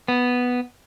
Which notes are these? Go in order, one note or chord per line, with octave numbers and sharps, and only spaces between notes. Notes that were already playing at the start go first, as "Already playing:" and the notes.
B3